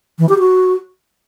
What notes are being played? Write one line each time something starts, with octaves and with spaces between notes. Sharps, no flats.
E3
G4
F#4